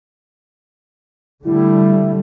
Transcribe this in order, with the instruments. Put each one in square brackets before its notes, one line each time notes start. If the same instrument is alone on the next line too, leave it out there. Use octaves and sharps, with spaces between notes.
[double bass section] D3 G3 A3 [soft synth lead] E4